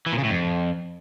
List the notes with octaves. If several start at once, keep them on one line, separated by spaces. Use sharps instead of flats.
E3
A#2
C#3
A2
F2